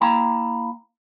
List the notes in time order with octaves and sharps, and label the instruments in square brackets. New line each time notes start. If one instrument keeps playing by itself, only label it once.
[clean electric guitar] A#3 E4 G5 A5 A#5